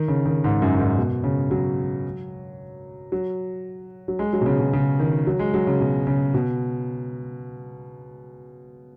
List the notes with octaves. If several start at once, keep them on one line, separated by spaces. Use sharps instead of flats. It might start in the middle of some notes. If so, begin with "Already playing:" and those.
Already playing: D#3
C#3
D#3
G#2
F#2
G#2
B2
C#3
F#3
F#3
F#3
G#3
F#3
B2
C#3
B2
C#3
D#3
F#3
G#3
F#3
C#3
B2
C#3
B2